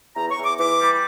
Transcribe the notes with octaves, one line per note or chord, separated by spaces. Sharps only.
E2 A#5
C#6
E2
D6
E3 D6
G3